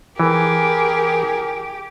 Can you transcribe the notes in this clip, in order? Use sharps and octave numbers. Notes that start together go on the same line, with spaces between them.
E3 G4 G#4 A#4